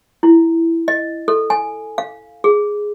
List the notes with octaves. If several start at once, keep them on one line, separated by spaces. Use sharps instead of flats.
E4
D#5
A4
G#5
F5
G#4